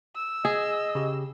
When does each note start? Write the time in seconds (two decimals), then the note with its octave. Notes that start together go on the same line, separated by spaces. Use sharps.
0.16 E6
0.45 G#4 D#5
0.95 C#3 G4